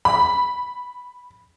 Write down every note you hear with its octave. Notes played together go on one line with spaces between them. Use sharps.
B5